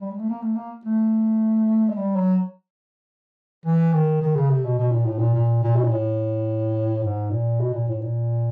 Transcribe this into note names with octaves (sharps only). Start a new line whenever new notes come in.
G3
G#3
A3
A#3
A3
A#3
A3
G#3
G3
F#3
E3
D#3
D#3
C#3
C3
B2
B2
A#2
A2
A#2
A#2
A#2
B2
A#2
A2
G#2
A#2
B2
A#2
A2
A#2